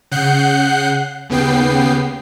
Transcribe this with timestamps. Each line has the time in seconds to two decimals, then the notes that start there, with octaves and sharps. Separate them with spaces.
0.11 C#3 F#5 F#6 G6 C7
1.30 D#2 C#3 B3 G5 C7